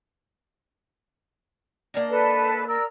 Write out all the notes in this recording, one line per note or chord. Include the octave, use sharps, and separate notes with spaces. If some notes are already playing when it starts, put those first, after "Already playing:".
A#3 D4 D#5
A4 B4 A5
A#4 D5 E6